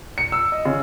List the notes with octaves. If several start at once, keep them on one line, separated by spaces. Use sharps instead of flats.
C#7
E6
D#5
C#3